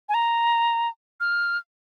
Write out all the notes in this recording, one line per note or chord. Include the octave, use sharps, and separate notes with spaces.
G#5
A#5
F6